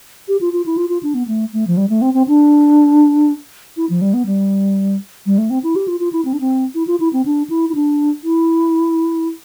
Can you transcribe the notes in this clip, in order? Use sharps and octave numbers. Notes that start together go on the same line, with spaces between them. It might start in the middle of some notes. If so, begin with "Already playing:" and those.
G4
F4
F4
E4
F4
F4
D4
B3
A3
A3
F3
G3
A3
C4
C4
D4
E4
F3
G3
B3
G3
G3
A3
C4
E4
G4
F4
F4
E4
C4
D4
C4
E4
F4
E4
C4
D4
E4
E4
D4
E4